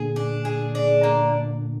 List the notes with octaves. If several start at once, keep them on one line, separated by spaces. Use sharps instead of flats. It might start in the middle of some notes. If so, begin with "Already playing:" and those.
Already playing: A#2 D3 G#4
D4
G#4
D4
A#3